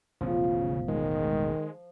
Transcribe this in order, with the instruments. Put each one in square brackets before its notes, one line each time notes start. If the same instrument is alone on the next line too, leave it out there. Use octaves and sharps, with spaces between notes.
[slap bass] E1 A1 B3 [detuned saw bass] C#3 [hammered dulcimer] F3
[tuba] D#3 [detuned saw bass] G#3